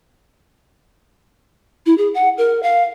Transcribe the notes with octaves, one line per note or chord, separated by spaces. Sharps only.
E4
G#4
F#5
A#4
F5